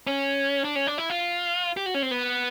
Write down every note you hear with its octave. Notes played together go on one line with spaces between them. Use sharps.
C#4
D4
C#4
D4
E4
F4
G4
F#4
C#4
C4
B3